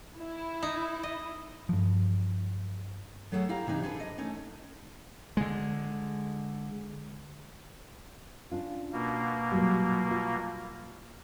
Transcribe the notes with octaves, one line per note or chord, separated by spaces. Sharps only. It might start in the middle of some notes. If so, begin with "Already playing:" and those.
E4
D#4
D#5
G2 F3
F#3 A3 G#4 A4 C#5 F#5
E4 G4 F5 A#5
C3 E3 D4 D#4
D4 G#4 A4 B4
D#5
A3 C#4 D#4 A4
D3 G#3
C#4 D4 F4
B2 A#3
A#2 F#3 G3
F4